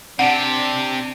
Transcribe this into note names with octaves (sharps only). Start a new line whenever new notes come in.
C3 D4 G4 F#5